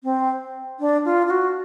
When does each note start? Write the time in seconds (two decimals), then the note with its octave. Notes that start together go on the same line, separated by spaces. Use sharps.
0.04 C4
0.80 D4
1.05 F4
1.26 F4
1.30 F#4